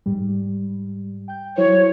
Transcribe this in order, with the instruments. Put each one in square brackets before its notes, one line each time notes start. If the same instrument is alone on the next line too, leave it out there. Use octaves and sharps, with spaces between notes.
[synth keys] G#2 G3
G5 G6
[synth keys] F#3 E4 C5 [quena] C#5